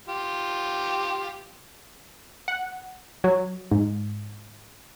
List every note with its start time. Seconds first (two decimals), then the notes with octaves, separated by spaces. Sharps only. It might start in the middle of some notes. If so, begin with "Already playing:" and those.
0.08 F4 G4
2.48 F#5
3.24 F#3
3.71 G#2